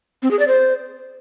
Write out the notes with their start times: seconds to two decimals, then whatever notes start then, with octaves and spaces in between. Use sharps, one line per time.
0.23 C4
0.31 G#4
0.39 D5
0.48 C5